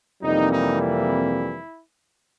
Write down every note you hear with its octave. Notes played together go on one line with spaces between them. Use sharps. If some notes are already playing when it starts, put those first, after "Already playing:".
F2 C3 E3 G3 A#3 D#4
D#4
E4